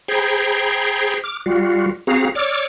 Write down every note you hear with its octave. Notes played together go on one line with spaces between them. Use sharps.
G#4 C5 G5 A#5 B5 G#6
D6 F6
G3 F4 F#4
C4 F#4 G#4 F5 A#5
C#5 D5 D6 E6 F6